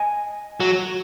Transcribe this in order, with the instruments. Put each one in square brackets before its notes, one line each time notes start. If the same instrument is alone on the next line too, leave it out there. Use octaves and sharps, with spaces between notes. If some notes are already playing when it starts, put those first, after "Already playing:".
Already playing: [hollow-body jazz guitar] D#5 G#5
[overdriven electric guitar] F#3